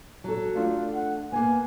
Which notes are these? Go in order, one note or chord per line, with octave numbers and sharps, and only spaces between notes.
F#3 A4
A3 D4 F4
F#5
A#3 B3 G#5